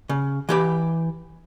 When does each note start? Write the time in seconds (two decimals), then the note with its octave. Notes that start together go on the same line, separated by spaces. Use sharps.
0.09 C#3
0.49 E3 G4 B5